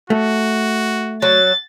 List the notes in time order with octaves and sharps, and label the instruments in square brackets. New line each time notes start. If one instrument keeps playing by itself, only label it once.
[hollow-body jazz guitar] A3 [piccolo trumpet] F#4
[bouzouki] F#3 F#4 [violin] A6